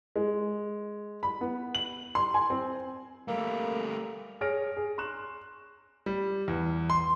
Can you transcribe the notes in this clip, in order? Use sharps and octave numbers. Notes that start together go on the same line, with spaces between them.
G#3
B5
B3
F#7
C6
G#5
C4
G3 A3 A#3
G#4 C#5 F6 A#6 D7
G#4
C6 C#6 F#6 E7
G3
E2
C6